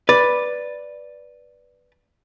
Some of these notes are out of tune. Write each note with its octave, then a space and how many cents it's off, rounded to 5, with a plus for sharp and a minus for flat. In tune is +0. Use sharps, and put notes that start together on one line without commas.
B4 -5 D5 +0